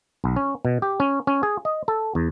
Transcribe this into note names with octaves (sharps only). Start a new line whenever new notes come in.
B1
C#4
B2
G4
C#4
C#4
G#4
D#5
A4
E2